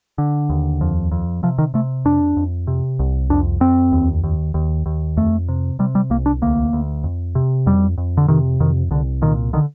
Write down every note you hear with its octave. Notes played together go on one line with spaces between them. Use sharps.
D3
D#2
F2
F2
C3 F3
D#3
C3 A3
F2 D4
F2
C3
C2
F2 D4
F2 C4
D#2
D#2
D#2
D#2
F2 A3
C3
C3 G3
G3
C2 A#3
D4
D2 A#3
D2
F2
C3
F2 G3
F2
D3
C3 D#3
F2 D#3
C2 D3
A#2 D#3
D3 D#3